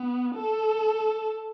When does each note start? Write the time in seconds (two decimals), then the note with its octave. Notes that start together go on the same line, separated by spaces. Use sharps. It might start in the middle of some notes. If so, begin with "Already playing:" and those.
Already playing: B3
0.36 A4